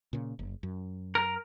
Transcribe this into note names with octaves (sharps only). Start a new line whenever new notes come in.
A#2 C#3
F#1
F#2
A#4